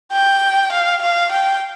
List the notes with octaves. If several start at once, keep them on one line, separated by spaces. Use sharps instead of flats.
G5
F5
F5
G5